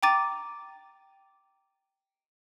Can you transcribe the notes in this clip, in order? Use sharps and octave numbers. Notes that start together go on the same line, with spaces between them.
G5 A#5 D6 A6 D#7